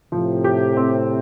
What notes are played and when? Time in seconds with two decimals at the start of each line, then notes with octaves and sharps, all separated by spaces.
0.12 A2 C3 F3
0.44 G4
0.77 C4